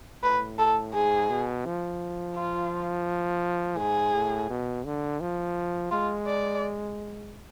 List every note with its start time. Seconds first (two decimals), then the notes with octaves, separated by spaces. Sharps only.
0.23 A2 B4
0.59 A4
0.94 G#2 G#4
1.30 B2
1.66 F3
2.36 F4
3.78 G#2 G#4
4.14 A2
4.50 B2
4.85 D3
5.21 F3
5.91 G#3 F4
6.27 D5